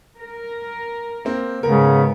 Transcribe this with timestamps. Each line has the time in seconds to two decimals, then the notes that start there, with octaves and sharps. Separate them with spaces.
0.19 A#4
1.25 A#3 C4
1.63 G#2 C#3 G#3 B3 A#4